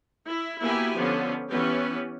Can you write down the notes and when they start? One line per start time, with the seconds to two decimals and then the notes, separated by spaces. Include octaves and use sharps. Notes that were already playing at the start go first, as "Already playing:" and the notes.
0.26 E4
0.61 A#3 B3 E4 F#4 G4 G#5
0.96 D3 F3 B3 C#4
1.49 E3 B3 C#4 G4 B4